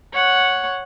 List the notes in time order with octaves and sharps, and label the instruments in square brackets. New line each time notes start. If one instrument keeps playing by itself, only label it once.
[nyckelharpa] C#5 F#5